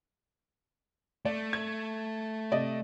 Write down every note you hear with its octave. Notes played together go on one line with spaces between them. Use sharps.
A3 D5
G#6
C3 D5 D#5